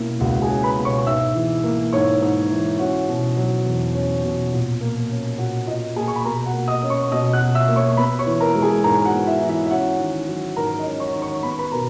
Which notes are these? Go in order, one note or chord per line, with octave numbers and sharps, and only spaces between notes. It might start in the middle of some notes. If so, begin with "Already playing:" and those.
Already playing: B2 A#3 C#4 E4 E5
C#2 F#4 F#5
G#4 G#5
C#4
B4 B5
B2
C#5 C#6
G#2 E5 E6
E3
A#3
G#2 C#5 C#6
G#2
E3
C#4 F#4 F#5
B2
F#3
E2
C#4
B2
A#2
A#3
C#4
A#2 F#4 F#5
A#2 D#5
A#3 G#4 G#5
C#6
B5
B2 A#4 A#5
F#4 F#5
A#3
D#5 D#6
C#4
C#5 C#6
B2 D#5 D#6
F#5 F#6
B2
E5 E6
A#3
C#5 C#6
B3 B4 B5
C#5 C#6
E3
A#4 A#5
G#3
G#4 G#5
G#2 A#4 A#5
F#4 F#5
B3
E4 E5
E3
E4 E5
E5
C#4 F#4 F#5
D#3
F#3
G#2 A#4 A#5
D#5
C#4
C#5 C#6
D#3
C#5 C#6
B3 B5
C#6
B4 B5
B2 A#4 A#5